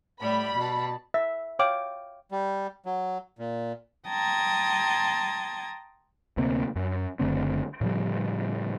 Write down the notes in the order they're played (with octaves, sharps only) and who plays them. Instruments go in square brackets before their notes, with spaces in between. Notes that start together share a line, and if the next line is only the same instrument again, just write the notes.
[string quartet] A2 G3 [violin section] B5
[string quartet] B2 A5
[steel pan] E5
C#5 F5 G5 D6
[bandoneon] G3
F#3
A#2
[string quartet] G5 A5 A#5 C6 D#6 G#6
[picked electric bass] D2 C3 A#3 C4
F#2
F#1 D3 A3 C4
A2 C#3 F3 G3